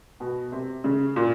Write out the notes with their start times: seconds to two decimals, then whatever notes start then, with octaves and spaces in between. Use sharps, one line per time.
0.20 B2
0.52 C3
0.84 C#3
1.16 A#2